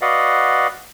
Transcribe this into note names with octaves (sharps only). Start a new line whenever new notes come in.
F#4 B4 D5 D#5 F5 F#5